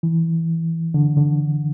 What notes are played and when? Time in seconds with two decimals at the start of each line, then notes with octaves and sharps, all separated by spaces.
0.03 E3
0.94 D3
1.17 D3